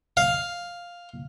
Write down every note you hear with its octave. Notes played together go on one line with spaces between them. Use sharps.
F5